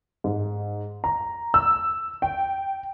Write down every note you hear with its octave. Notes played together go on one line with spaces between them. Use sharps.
G#2
A#5
E6
G5